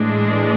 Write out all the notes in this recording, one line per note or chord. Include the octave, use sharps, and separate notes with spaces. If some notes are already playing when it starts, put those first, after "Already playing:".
Already playing: A2 E3 G#3 D4